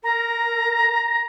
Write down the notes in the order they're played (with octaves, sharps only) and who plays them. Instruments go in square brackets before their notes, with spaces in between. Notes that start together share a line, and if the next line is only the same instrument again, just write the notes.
[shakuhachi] A#4 [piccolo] A#5